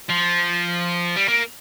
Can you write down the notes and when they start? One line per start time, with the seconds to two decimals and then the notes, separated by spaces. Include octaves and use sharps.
0.09 F3
1.16 G3
1.28 A#3